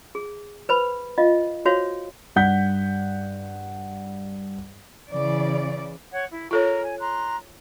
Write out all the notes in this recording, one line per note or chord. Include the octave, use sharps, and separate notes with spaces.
G#4
B4 C5 B5
F4 D#5 F5
F#4 C5 C#5 F5
G2 F#5 G6 B6
C#3 E3 D5
C#5 F#5 G#6
E4
F4 A4 A#4 C#5
G#5
A#5 C6 F#6